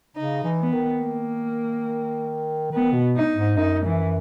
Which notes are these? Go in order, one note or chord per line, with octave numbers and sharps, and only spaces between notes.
C#3 D#4
E3
B3
D#3
A#3
D#3 B3
B2
D#4
G#2
F#2 D#4
E3